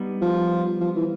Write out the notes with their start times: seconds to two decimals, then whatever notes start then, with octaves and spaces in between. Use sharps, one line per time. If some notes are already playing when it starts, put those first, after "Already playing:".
Already playing: G3 B3 D#4
0.21 F3
0.80 F3
0.96 E3